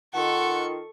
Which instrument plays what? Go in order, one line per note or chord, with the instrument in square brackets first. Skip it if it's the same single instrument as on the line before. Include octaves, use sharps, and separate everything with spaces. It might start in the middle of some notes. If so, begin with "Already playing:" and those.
[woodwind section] D#3 F4 [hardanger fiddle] A4 C#6 [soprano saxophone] F#5